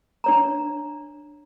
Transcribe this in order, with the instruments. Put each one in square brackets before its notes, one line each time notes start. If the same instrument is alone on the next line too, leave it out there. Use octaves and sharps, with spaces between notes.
[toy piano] D4 C#5 A#5